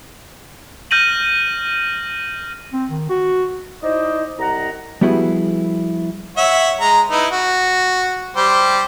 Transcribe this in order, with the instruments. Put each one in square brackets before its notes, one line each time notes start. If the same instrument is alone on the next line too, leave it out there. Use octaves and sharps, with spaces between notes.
[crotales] F6 G6 A#6 D#7 F#7
[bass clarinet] C4
D#3
F#4
[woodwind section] D#4 E4 C5 D5 D#5
C2 D#5 F#5 A#5
[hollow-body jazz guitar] F3 G3 B3 E4 F#4 G#4
[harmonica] C#5 E5 F#5
G#3 A#5
D#4 E4 B4
F#4
G3 G4 C5